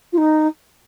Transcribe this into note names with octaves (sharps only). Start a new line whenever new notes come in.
F4
D#4